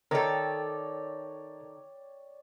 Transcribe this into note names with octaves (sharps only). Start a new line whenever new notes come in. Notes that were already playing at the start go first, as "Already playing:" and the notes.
D#3 A4 A#4 C#5 D5 G5